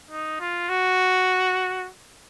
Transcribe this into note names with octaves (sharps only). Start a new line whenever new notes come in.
D#4
F4
F#4